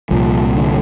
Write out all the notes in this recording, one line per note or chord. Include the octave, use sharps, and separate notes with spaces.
C2 A#2 F3
D3